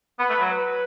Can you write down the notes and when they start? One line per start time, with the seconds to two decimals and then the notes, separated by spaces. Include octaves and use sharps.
0.19 B3 B4
0.29 A3
0.39 F#3
0.49 B4